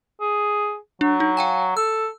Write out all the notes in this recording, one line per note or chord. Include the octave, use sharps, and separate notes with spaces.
G#4
F#3 D4
D#4
F5 G5 G#5
A4 E6